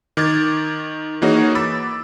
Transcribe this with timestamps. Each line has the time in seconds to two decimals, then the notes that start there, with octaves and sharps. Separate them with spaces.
0.17 D#3 D6 G#6 A6
1.22 E3 A#3 D#4 F#4 G#4 C#5
1.55 B5 D6 E6 A6